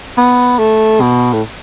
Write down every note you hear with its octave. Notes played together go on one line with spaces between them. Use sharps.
B3
A3
B2
A2